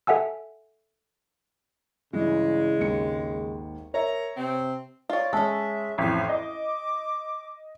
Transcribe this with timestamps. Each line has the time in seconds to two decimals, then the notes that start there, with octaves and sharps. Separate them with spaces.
0.07 A4 E5 F#5 G#5 E6
2.13 G2 C#3 E3 G#3
2.79 G#1 D#2 C#7
3.94 A#4 C#5 E5 A#5
4.37 C3 C4
5.10 F4 C#5 D5
5.33 G#3 C#4 A4 E5
5.98 A1 F2 B6
6.29 D#5 D6